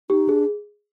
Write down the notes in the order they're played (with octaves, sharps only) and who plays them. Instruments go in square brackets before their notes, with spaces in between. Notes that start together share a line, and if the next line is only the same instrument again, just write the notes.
[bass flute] D#4 [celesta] G4
[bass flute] D4 [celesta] G#4